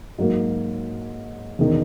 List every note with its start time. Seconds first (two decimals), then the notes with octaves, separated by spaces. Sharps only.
0.18 G#2 F#3 A#3
1.59 E1 D#3